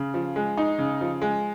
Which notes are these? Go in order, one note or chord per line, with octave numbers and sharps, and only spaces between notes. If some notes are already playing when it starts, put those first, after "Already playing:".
Already playing: C#3
F3
G#3
D#4
C#3
F3
G#3